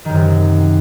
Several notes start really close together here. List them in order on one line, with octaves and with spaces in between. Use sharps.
D#3 F#2 C3